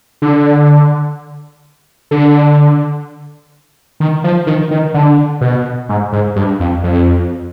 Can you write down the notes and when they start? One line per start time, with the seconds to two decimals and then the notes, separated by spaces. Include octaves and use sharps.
0.22 D3
2.11 D3
4.00 D#3
4.24 F3
4.47 D#3
4.71 D#3
4.94 D3
5.41 B2
5.89 G#2
6.12 G#2
6.36 G2
6.60 F2
6.84 F2